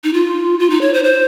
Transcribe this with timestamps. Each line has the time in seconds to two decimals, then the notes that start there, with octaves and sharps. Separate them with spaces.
0.04 D#4
0.13 F4
0.59 F4
0.70 D#4
0.81 C#5
0.94 C5
1.04 C5